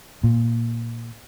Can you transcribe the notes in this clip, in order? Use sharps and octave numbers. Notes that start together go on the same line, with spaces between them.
A#2